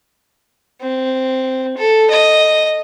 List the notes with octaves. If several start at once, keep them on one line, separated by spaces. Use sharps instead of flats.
C4
A4
D#5